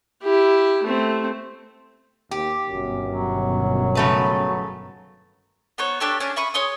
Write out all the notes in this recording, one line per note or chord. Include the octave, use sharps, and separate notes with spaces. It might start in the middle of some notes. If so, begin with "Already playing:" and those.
E4 G4
A3 C4
D#2 G4
G1 F#2 B2 D#3
F#3
C#3 A3 B4
B3 D#4 C5 C#5
D4 G4 A4 C#5
C#4 D4 G#5
E5 B5 C#6 D#6
G#4 C#5 C6 D#6